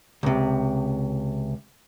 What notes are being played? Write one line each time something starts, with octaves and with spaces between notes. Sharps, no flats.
C#2 C3